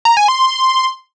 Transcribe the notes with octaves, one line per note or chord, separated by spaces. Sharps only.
A#5
G#5
C6